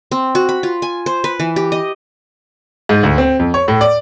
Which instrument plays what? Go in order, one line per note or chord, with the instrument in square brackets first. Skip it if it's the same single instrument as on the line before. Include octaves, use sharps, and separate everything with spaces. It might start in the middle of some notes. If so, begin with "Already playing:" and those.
[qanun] C4
F#4
B5
F4
G#5
C5
B4
E3
G4
D#5
[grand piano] G#2
D2
C4
F2
C#5
A2
D5